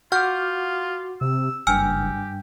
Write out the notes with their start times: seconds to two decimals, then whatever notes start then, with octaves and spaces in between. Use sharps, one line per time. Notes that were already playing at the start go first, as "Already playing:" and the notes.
0.12 F4 F#4 F#5 D6 F6 G6
1.21 C3 E6
1.67 F#1 G2 G4 G5 G#5 E6 F6